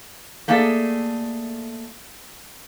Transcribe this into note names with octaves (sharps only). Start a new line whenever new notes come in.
A3 A#3 G#4 A4 D5 E5